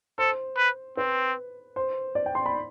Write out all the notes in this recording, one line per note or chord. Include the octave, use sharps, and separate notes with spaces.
A4 C5
B4
C4 B4
C5
D5
G5
C6
B5